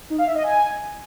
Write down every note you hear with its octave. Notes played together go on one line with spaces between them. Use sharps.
D#4
F5
E5
D#5
G#5